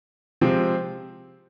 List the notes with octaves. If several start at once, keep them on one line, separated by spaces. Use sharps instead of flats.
C3 F3 G#3 C4